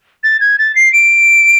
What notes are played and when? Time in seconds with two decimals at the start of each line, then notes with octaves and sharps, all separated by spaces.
0.24 A6
0.40 G#6
0.59 A6
0.75 C7
0.93 D7